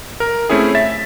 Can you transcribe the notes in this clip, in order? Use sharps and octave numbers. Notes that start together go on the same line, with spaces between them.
A#4
A3 C4 C#4 E4 G#4
E5 A6 B6